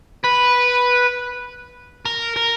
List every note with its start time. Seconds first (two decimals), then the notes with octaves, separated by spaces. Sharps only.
0.24 B4
2.06 A#4
2.36 A#4